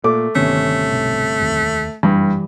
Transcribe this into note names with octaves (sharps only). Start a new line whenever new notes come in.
A#2 A3 D6
G1 C3 D#3 A3 B3 C#4
B1
F1 D#2
F#1 G2 E3 G3